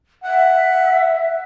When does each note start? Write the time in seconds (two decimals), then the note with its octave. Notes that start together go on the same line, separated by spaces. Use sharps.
0.24 E5 F#5